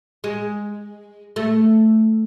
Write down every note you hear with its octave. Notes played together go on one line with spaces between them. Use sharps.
G#3
A3